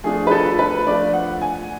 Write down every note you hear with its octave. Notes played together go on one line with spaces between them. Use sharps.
F3 A3 D4 F4 G#4
B4
A4
B4
F3 A3 D4 F4 D5
F#5
G#5